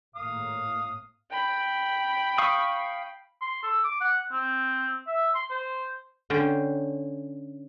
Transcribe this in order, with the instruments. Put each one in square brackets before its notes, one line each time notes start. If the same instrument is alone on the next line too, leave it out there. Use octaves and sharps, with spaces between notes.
[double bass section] G#1 A2 A#3 [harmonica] F5 D#6
[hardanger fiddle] G5 B5
[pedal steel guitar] F5 C#6 D#6
[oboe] C6
A4
D6
F#5
C4
E5
C6
C5
[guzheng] D3 C#4 C5 G5